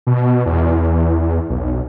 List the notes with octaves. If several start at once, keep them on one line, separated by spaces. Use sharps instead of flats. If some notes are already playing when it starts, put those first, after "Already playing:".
B2
E2
B1